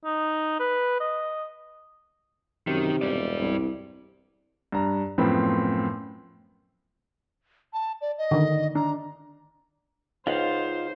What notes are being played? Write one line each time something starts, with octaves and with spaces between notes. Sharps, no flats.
D#4
B4
D#5
F#2 C3 D#3
E1 G2 D5
C2
G2 A#5
F#2 A2 F3 B3 C4 B5
A5
D5
D#5
D3 D#3
D4 A#5
C#2 D#4 F4 C5 F5 F#5